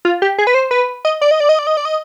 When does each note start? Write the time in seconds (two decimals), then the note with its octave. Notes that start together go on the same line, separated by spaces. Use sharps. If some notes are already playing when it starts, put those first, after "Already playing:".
0.05 F4
0.22 G4
0.38 G#4
0.47 B4
0.54 C5
0.71 B4
1.05 D#5
1.21 D5
1.31 D#5
1.40 D5
1.49 D#5
1.59 D5
1.67 D#5
1.77 D5
1.85 D#5